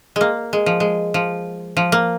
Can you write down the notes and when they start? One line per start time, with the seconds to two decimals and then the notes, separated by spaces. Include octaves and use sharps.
0.16 G#3 A#3
0.53 G#3
0.66 F3
0.80 G#3
1.14 F3
1.77 F3
1.92 A#3